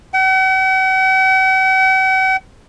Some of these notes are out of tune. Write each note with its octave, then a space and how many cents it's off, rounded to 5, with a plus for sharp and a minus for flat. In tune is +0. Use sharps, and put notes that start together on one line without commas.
F#5 +45